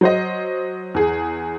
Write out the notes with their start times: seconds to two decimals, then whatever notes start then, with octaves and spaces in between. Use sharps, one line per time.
0.01 F#3 C5 D#5
0.94 E2 G#4